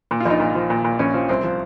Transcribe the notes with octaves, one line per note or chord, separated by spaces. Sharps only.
A#2
F4
A#1 D#4
A#2
F3
A#2
A#2
A#1 C#4
F3
C2 C4
F3